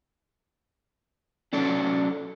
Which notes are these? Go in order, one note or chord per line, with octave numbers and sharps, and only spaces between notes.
F#3 C#4 A4 D5